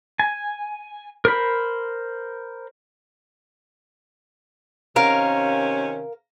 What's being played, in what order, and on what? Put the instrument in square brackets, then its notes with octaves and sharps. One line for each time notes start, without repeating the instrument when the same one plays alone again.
[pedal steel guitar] G#5
A#4 C5 B5
[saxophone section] C3 D#3 C#4 [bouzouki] A#4 F5